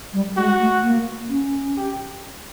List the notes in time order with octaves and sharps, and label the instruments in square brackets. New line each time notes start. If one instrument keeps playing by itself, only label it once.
[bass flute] G3
[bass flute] G#3 [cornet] F#4
[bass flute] A3
A#3
C#4
[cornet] G4